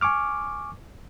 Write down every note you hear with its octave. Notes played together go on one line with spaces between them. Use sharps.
G#5 C#6 D6 F6